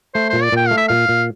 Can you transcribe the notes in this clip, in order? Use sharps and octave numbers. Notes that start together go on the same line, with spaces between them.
A3 C5
A#2 C5
D5
A#2 G5
A3 F5
E5
A#2 F5
A#2